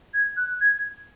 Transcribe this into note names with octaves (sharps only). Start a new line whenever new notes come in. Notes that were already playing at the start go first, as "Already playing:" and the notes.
G#6
F#6
G#6